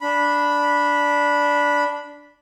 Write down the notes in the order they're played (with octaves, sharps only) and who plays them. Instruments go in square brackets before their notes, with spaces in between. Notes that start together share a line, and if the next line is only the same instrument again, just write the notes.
[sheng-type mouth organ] D4 B5